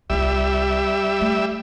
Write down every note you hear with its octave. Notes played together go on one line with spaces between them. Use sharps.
C2 G3 F4 E5
A3